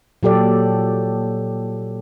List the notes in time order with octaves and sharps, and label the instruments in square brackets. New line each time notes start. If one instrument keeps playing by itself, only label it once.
[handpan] A#2 F#3 G4 A4 D5